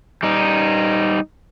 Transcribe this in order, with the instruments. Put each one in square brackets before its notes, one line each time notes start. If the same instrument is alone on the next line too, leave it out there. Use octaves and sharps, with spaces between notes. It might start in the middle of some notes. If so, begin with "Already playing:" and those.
[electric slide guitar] G3 D#4